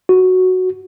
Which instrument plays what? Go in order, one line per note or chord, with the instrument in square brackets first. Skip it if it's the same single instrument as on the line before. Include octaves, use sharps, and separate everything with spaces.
[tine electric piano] F#4